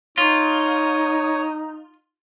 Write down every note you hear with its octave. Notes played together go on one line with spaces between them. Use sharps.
D#4 F4 C#5 D#6